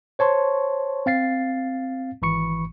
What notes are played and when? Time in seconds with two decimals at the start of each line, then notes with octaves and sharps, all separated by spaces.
0.19 C5 C#5 A5 C6 C#6
1.06 C4 F5 A6 C7
2.22 G#1 E3 B5 C#6 C#7